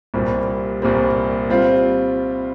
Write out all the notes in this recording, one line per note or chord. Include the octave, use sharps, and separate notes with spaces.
C2 A#2 G3 C4
C2 A#2 G3 C4
G3 C4 F4